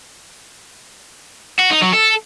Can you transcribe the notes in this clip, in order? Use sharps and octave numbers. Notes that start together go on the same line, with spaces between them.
F#4
D#4
F#3
A4